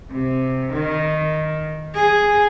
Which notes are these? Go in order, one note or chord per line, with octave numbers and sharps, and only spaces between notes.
C3
D#3
G#4